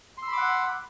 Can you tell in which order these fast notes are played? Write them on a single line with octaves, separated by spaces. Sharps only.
C6 E6 B5 D6 F#5